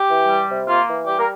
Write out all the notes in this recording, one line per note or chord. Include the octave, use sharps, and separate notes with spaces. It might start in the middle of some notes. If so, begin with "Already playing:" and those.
Already playing: G4
E3
G3
C3
A#3 F4
E3
G3 G4
A#4